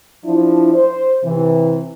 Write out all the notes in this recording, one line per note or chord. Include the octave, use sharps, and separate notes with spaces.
F3 D4 E4
C5
C3 E3